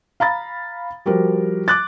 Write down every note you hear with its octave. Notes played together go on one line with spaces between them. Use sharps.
F5 A#5 B5 A6
F3 G3 F#4 A#4
D6 F#6 A6